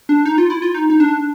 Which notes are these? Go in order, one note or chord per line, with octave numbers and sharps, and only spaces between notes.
D4
D#4
F4
E4
F4
D#4
D#4
D4